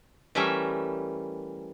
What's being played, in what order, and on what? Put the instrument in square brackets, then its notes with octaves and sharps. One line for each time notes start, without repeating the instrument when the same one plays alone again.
[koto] E3 G3 A3 C#4 A#4 E5